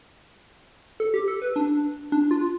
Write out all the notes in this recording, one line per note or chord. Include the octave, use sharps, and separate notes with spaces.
A4
G4
A4
B4
D4
D4
F4